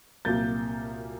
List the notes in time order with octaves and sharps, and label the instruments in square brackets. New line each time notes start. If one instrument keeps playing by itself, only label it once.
[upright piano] C2 A#2 F#3 A#3 G6 A6